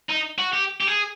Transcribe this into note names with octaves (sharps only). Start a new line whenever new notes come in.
D#4
F#4
G4
G4
G#4